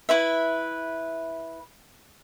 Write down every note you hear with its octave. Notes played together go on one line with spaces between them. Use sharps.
E4 B4 E5